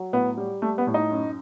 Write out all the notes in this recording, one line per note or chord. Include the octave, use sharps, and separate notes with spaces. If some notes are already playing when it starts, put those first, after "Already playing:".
Already playing: F#3
A2 B3
G3
G3 A3
B3
A2
D#4
F#2